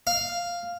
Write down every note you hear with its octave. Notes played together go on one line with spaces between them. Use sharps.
F5